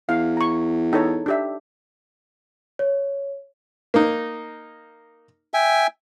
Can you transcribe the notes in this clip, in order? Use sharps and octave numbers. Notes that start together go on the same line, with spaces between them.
E2 F5
A#5 C#6
D#4 A4 C#5
D4 G4 E5
C#5
A#3 D#4
E5 G5 G#5